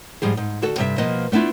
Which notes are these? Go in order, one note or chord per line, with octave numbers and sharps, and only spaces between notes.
G#2 F3 G3 G#4
G#2
D2 F#4 A4
G2 C3 G3 E5
B2 F3 A#3 B4 D#5
A3 B3 D4 E4 F4